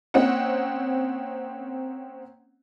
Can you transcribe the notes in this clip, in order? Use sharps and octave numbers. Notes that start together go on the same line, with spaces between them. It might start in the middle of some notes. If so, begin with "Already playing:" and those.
A#3 C4 C#4 D#5 F#5